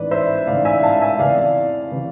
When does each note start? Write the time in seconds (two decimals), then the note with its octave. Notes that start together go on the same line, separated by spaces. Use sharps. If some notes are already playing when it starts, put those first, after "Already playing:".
Already playing: A1 G#2 E3 B4 D5
0.11 C5 E5
0.47 A1 G#2 E3 D5 F5
0.65 E5 G#5
0.83 F5 A5
1.02 E5 G#5
1.19 E2 C3 E3 D5 F5
1.92 C3 E3